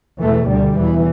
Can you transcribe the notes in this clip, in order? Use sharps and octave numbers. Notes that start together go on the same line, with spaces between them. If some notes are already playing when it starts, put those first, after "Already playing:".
E2 B2 E3 A3
D2 D3 G3
E2 B2 E3